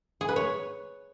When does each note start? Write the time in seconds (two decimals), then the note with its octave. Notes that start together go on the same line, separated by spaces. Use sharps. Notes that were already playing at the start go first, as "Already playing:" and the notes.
0.21 G#4
0.28 B4
0.36 C#5